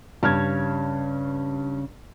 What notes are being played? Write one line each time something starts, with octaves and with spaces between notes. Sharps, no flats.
G2 C#3 F6 G#6